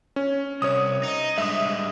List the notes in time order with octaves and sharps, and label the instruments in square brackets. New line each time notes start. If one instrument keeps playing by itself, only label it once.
[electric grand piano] C#4
[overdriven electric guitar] C2 [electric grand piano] C#5 D#6
[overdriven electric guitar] D#4
[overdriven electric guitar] G2 G#3 [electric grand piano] E5 D#6